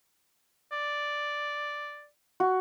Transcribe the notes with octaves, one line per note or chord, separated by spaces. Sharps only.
D5
F#4